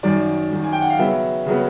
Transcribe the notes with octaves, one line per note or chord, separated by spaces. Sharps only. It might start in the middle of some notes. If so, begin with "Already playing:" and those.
F#2 D#3 F#3 D5
F#2 D#3 F#3
G#5
G5
F#5
F5
C#3 F#3 B3 E5
C#3 F#3 B3